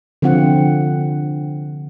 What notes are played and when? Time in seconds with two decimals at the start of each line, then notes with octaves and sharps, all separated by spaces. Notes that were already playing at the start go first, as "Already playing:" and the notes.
0.22 D3 F3 C4 F4 F#5